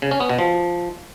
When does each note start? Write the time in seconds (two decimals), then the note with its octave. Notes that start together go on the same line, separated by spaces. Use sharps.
0.02 C#3
0.11 C#4
0.20 B3
0.29 B2
0.39 F3